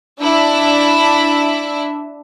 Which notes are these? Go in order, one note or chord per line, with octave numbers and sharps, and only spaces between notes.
D4 E4 E5